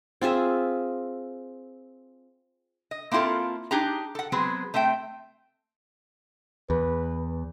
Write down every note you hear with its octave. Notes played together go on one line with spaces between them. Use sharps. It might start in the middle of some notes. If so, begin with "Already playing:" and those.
C4 F4 G#4 E5
D#5
A#3 C4 E4 F4 A4
D4 D#4 G4 G#4 A#5
A4 F#5
F#3 G#3 B3 C4 G#4 B4
A3 C4 E5 G5
E2 B4